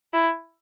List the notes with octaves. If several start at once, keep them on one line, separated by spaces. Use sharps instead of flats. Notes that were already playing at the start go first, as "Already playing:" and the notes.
E4